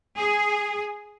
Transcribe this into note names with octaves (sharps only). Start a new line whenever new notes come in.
G#4